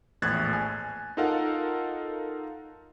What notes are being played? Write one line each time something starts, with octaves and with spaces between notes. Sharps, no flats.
A#1 E2 A2 F#6 G#6 A6
G#5
D#4 F4 A4 A#4 F5 F#5